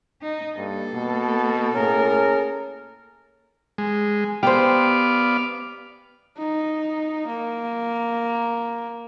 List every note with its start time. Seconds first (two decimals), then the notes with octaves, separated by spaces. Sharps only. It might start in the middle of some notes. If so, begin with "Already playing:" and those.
0.22 D#4
0.57 G2 A#3 A4
0.94 B2
1.75 A2 C#4 G#4 A#4
3.78 G#3
4.43 B3 G4 C5 D5 F5
6.37 D#4
7.27 A#3